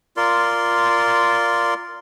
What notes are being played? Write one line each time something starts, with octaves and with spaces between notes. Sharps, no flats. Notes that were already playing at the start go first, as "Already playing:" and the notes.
F4 A#4 D5 C6